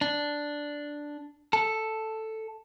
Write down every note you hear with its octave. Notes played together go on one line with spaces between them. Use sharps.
D4
A4